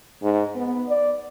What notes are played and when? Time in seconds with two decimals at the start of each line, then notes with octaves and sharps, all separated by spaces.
0.22 G#2
0.55 B3
0.89 D5